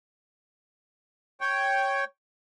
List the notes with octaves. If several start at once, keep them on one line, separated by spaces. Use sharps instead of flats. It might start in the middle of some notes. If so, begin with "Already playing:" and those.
C#5 G5